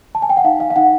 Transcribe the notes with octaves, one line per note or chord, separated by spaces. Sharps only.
A5
G#5
G5
F#5
D#4 F5
F5
F5
D#4 F#5